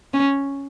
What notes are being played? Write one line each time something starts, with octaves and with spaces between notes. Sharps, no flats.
C#4